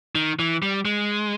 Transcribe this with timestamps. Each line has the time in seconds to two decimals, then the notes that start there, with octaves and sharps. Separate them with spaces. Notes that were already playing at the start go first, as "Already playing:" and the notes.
0.15 D#3
0.39 E3
0.63 G3
0.85 G#3